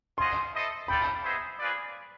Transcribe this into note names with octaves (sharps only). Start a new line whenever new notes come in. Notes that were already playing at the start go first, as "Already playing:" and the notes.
F4 G#4 C5 D#5 F#5 C6
E4 A4 C5 D#5
F4 A4 D5 G5 B5
B3 D#4 G#4 C5 E5
C4 F4 G#4 B4 D5